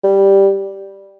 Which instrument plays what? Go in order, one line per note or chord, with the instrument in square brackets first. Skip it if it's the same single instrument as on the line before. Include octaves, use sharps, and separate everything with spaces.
[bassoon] G3